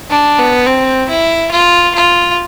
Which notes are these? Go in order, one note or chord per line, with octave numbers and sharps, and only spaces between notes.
D4
B3
C4
E4
F4
F4